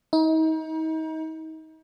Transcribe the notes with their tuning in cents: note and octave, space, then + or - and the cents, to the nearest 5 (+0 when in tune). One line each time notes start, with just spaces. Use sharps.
D#4 +35